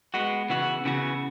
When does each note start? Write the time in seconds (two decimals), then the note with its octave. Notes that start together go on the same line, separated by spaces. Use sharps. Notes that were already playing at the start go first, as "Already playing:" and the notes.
0.14 G#3 B3 F#4
0.49 C#3 E3 B3 F#4
0.85 C#3 E3 B3 F#4